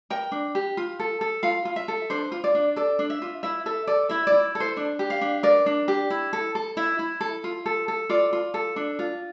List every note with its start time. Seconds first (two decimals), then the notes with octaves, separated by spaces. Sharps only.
0.10 A#4 G5
0.32 D4
0.55 G4
0.77 F4
1.00 A4
1.21 A4
1.43 F4 F5
1.65 F4
1.76 E5
1.88 A4
2.10 D4 C5
2.32 F4
2.44 D5
2.55 D4
2.76 A4 D5
2.99 D4
3.10 E5
3.22 F4
3.43 E4 E5
3.66 A4 E5
3.87 A4 D5
4.09 E4 E5
4.27 D5
4.32 E4
4.55 A4
4.60 C5
4.77 D4
4.99 G4
5.10 F5
5.21 D4
5.43 A#4 D5
5.66 D4
5.88 G4
6.10 E4
6.33 A4
6.55 A4
6.77 E4 E5
6.99 E4
7.21 A4
7.44 F4
7.66 A4
7.88 A4
8.09 F4 D5
8.33 F4
8.54 A4
8.76 D4
8.99 F4